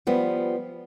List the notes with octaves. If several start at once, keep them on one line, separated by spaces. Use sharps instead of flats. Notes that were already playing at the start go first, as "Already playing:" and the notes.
F3 G3 B3